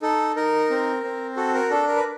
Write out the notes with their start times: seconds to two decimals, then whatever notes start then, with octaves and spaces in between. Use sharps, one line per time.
0.02 D#4 A4
0.36 D#4 A#4
0.70 C4
1.04 C4
1.36 F#4 A4
1.54 A#4
1.70 D4 A4
1.87 A#4
1.96 B4